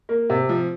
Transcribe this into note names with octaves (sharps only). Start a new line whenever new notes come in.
A#3
C3
F3